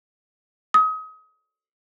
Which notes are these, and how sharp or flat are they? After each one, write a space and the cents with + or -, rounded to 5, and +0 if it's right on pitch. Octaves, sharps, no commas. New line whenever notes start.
D#6 +30